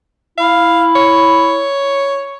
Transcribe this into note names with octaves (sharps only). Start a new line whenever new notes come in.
E4 F5
C#5